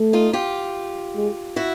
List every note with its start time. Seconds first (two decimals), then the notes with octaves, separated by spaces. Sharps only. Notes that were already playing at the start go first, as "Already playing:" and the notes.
Already playing: A3
0.13 D#4 F4
0.33 F4 G4
1.16 G#3
1.56 E4 F#4